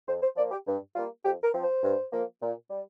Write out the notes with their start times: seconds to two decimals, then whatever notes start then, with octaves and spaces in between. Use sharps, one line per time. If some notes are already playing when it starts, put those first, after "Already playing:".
0.08 F2 C5
0.22 C5
0.36 F3 A#3 D5
0.51 G4
0.66 G2
0.95 G3 A#3 F4
1.24 F2 G4
1.43 A#4
1.53 F3 C4
1.63 C5
1.83 G2
2.12 F3 A#3
2.41 A#2
2.70 G3